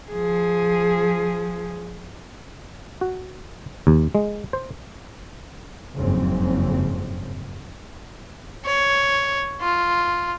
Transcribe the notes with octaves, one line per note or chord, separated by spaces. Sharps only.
F3 G#4
F#4
D#2
G#3
C5
F#1 F2 G#2 C#3 C4
C#5
F4